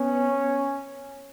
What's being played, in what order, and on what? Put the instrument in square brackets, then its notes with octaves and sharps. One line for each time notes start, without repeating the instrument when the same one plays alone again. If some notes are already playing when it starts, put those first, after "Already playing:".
Already playing: [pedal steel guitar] B3 [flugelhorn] C#4